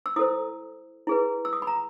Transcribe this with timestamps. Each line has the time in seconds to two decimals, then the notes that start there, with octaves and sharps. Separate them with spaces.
0.06 E6
0.16 E4 A4 C5 D#6
1.07 E4 G#4 B4
1.45 E6
1.53 D#6
1.62 B5
1.67 A#5